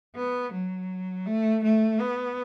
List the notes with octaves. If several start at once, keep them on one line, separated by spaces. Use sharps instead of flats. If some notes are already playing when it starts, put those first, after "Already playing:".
B3
F#3
A3
A3
B3